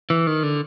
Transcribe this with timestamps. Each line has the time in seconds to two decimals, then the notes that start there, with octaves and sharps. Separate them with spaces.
0.10 E3
0.27 D#3
0.43 D3